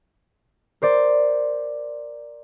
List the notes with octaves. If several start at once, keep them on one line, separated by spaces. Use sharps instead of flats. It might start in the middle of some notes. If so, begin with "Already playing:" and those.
A#4 C5 D5